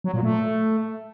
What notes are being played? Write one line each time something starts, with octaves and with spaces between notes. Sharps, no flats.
F#3
A#2
A3